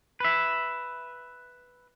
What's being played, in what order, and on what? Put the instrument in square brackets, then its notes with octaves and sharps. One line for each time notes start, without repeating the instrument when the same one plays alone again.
[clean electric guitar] B4 E5